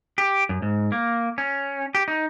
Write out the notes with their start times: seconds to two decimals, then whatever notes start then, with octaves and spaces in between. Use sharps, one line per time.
0.18 G4
0.49 F#2
0.62 G#2
0.92 A#3
1.38 C#4
1.95 G4
2.08 D#4